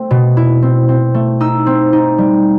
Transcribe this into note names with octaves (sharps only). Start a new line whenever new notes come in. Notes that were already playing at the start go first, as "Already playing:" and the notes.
Already playing: A3 C4
B2
E4
C4
C4
A3
D#4 E6
C4
D#4
G3